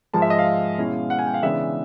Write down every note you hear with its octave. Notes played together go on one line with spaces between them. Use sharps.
G#2 F3 G#3 A5
E5
D#5
F5
B2 G#3 C#4 E4
F#5
G#5
G5
F5
C#3 E3 G#3 B3 D4 E5